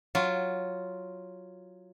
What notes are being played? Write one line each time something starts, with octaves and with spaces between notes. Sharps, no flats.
F#3 F4